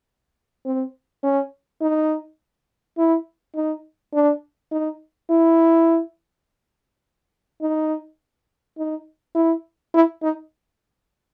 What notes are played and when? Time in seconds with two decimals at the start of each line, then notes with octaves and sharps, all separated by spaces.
0.65 C4
1.23 C#4
1.82 D#4
2.98 E4
3.55 D#4
4.13 D4
4.72 D#4
5.30 E4
7.61 D#4
8.78 D#4
9.35 E4
9.94 E4
10.22 D#4